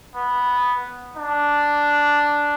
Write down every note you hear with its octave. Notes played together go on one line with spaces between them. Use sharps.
B3
D4